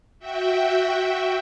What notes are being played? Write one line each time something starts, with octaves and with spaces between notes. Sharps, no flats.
F#4 E5 G5